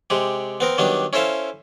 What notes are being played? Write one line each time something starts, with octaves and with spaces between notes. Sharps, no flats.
C3 G#3 G4
B3 C4 A#4
D#3 F#3 G3 B3 D4
C#4 E4 A4 C5 E5 F5